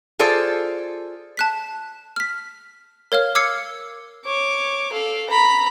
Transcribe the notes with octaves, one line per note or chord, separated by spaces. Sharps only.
F4 G#4 A4 C5 D5
A5 F#6 B6
F6 B6
A#4 C#5 F5 F6
D6 E6 F6 G#6 C7 C#7
C#5 D6
A4 F5
A#5 B5